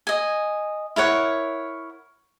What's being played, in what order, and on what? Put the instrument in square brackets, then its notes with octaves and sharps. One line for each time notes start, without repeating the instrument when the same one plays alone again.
[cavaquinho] D#5 G#5
E4 A#4 C#5 F#5